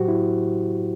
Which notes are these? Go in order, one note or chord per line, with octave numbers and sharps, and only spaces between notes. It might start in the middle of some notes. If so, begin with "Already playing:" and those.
Already playing: A2 F#3 F#4 G4 C5
E4